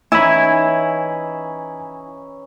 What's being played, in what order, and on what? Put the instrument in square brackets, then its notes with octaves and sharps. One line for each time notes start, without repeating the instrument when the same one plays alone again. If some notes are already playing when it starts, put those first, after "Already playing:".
[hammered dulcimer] E3 C#4 D#4 [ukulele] E4 [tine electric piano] G#5 B5